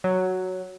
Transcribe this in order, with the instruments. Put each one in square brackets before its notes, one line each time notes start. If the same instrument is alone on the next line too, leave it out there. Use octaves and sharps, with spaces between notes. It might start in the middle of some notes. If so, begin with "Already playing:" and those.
[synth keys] F#3